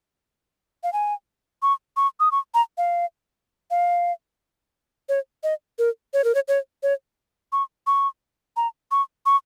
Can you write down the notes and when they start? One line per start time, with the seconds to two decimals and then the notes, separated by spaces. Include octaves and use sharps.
0.83 F5
0.93 G#5
1.62 C#6
1.97 C#6
2.20 D#6
2.32 C#6
2.54 A#5
2.78 F5
3.71 F5
5.09 C#5
5.43 D#5
5.79 A#4
6.14 C#5
6.24 A#4
6.35 C#5
6.48 C#5
6.83 C#5
7.52 C#6
7.87 C#6
8.57 A#5
8.91 C#6
9.26 C#6